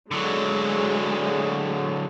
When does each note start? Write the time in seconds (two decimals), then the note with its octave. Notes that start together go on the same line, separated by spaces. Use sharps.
0.11 D3 F#3 G#3